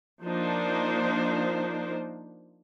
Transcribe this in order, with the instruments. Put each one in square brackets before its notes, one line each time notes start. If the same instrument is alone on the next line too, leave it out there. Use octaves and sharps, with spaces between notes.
[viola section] F3 A#3 D4 D#4 C5